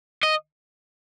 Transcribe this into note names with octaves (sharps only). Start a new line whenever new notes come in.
D#5